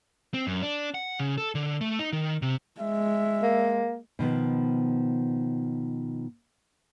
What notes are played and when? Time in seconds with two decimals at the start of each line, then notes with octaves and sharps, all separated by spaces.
0.34 C4
0.47 F#2
0.62 D4
0.94 F#5
1.19 C#3
1.38 A4
1.55 D3
1.81 A3
1.99 D#4
2.13 D#3
2.42 C3
2.80 G#3 E5
3.43 A#3
4.19 B2 D#3 F3 B3